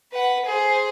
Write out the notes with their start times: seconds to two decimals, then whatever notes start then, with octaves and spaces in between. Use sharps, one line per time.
0.12 B4 F#5
0.46 G#4 C5